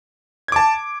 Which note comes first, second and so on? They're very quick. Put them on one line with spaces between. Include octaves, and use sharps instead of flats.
G#6 D6 A5